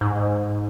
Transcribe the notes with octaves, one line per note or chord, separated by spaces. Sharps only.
G#2